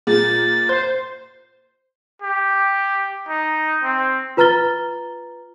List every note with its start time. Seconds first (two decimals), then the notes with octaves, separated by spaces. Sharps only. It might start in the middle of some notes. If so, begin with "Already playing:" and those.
0.07 A#2 G#4 A6
0.69 C5 G6
2.22 G4
3.29 D#4
3.83 C4
4.37 F4 B4 A#5 F6 A6 G7